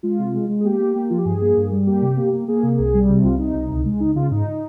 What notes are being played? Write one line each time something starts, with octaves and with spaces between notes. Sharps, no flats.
G#3 F4
C3
G#3
G#3
G#4
A#3 G4
A#3
A#3
F3 F4
G4
G2 G#4
A#3
G2
G3
A#3 G4
C3
A#3
A#3
A#3 G#4
C3
C2 G#4
G3
C3
C2 F4
C3 D#4
C2
C#2
G#3
C#2 D#4
C#3 F4
G#2 D#4